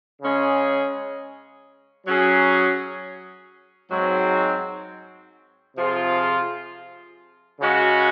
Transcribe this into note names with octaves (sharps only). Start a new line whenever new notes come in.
C#3 G#3 C#4 G#4
F#3 C#4 G#4
G#2 F#3 C4
C3 F3 C4 F4 G#4
C#3 G#3 C#4 F#4